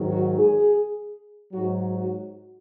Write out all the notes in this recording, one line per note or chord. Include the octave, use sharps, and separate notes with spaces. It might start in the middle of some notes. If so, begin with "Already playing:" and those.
Already playing: G#2 D#3 F#3
F#4
G#4
G#2 F#3 F#4
F#4